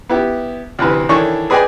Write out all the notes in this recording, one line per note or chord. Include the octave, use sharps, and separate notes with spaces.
B3 E4 G4
D2 C3 E3 B4
D#3 E3 D4 A4 C#5 C#6
G#4 B4 D5 D#5 G5 G#5